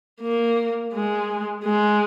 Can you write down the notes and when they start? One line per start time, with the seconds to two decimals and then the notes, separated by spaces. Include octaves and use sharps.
0.21 A#3
0.94 G#3
1.65 G#3